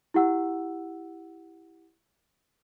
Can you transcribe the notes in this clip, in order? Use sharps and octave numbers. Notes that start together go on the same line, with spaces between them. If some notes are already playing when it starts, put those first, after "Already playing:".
E4 G4 F#5 E6